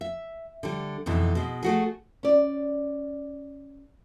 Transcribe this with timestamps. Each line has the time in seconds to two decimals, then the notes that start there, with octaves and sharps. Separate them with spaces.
0.01 E5
0.63 D3 G3
1.06 F2 G#2 B2 E3
1.35 B2 G#3
1.63 A3 F#4 G#4
2.23 C#4 D5